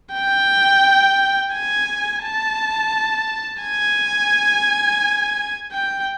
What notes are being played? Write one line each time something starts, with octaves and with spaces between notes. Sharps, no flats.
G5
G#5
A5
G#5
G5